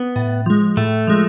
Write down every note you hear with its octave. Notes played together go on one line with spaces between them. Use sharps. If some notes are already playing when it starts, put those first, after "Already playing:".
Already playing: B3
A2
F3 G#3
A2 A3
F3 G#3